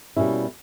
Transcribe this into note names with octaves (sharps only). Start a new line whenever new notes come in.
B2 G3 A#3 C#4 E4